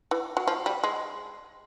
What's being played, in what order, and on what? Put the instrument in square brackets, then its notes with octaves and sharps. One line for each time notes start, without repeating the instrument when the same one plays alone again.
[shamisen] E3
F#3
F3
G3
G#3